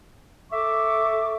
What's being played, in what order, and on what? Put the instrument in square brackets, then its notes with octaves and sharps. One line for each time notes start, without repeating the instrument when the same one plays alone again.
[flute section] A4 C#6 D6 [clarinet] E5